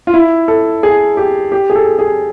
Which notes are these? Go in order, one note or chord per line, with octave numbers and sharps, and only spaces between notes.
F4
E4
A4
G#4
G4
G4
G#4
A4
A4
G#4